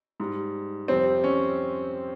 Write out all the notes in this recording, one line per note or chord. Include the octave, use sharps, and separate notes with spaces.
G#2 G3
F2 C3 G3 C4
C#4